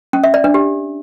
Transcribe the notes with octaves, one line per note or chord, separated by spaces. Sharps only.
C#4
E5
D5
D4
G4